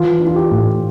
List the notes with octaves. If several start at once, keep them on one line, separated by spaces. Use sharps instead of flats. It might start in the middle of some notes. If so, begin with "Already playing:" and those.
Already playing: E3 F4
D4
F4
G4
A2